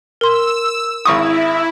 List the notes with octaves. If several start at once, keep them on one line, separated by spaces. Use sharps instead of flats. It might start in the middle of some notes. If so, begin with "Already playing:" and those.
A#4 C6 E6
G#1 E4 C#6 D#6